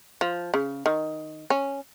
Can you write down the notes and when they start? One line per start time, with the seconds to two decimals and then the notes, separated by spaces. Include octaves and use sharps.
0.21 F3
0.54 C#3
0.86 D#3
1.50 C#4